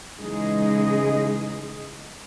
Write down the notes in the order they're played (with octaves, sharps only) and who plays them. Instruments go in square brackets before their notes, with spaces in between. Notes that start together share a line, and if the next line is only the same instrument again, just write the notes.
[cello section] C#3 E3 G#3 D#4 G#4 D#5